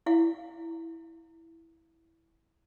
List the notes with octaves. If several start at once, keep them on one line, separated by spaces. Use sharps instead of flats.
E4 F5